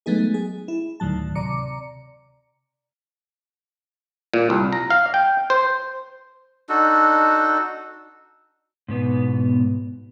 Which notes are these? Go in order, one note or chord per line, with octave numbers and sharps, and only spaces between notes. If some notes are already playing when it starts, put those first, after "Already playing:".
F#3 G#3 A3 B3 D#4 G#4
G#4
E4
D2 A2 D#3 F#3 A5
C3 D5 A#5 D6 C#7
A#2
C2
A#5
F5
G5
C5
D4 D#4 F#4 A4
G#2 B2 B3